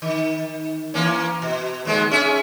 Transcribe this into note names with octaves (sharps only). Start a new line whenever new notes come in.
D#3
E3 A#3 C#4
B2
D#2 G#3 B3
C#4 G#4 E5